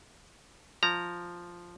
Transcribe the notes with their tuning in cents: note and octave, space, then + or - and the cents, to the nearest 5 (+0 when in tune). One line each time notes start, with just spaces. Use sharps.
F3 +0 A#5 -10